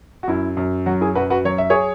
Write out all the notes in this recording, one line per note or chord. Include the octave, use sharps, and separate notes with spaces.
F#4
F#2 E4
F#2
F#3 F#4
E4 G#4
F#2 F#4 B4
F#4 B4
F#3 C#5
E5
G#4 C#5